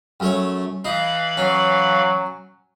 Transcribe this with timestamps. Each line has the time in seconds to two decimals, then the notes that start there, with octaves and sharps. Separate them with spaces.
0.20 F#2 A3 C#5
0.85 E3 D#4 F5 B5
1.37 F#3 C#4